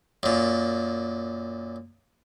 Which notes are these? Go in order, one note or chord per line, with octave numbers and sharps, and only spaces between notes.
F#2 A#2